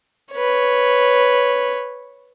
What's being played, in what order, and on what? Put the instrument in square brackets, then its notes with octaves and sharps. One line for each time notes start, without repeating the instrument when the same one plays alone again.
[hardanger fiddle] B4 C#5